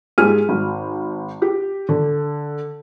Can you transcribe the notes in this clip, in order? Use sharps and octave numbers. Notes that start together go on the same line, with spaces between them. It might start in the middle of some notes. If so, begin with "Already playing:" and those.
G#2 G4 G#4 G#5 F6 D#7
G#1
G4
D3